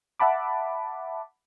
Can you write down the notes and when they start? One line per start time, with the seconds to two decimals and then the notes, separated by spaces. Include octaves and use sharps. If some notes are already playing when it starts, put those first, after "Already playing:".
0.20 E5 F#5 A5 B5 D6